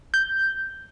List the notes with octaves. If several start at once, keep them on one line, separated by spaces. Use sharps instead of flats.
G6